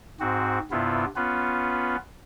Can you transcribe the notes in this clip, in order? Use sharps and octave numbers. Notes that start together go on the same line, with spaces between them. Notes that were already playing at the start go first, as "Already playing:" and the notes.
G#2 C4 F#4
G2 C3 B3 E4 F4
B3 C#4 F4 B4